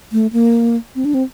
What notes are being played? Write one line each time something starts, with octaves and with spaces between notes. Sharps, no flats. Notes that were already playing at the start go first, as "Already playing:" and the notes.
A3
A#3
C4
D4
C4